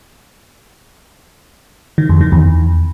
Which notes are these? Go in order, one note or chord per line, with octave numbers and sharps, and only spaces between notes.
D#3
F2
D#3
E2